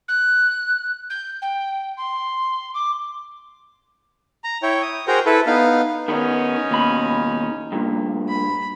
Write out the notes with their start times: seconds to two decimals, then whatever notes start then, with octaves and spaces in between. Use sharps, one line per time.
0.08 F#6
1.10 G6
1.42 G5
1.97 C6
2.74 D6
4.44 A#5
4.63 E4 C#5 G5
4.82 D#6
5.08 F#4 G#4 A#4 C5 G5 A#5
5.26 E4 A4 B4
5.47 B3 D#4 F5
6.08 D#3 B3 C#4 D#4
6.71 D#2 B2 B5
7.72 G2 A#2
8.28 B5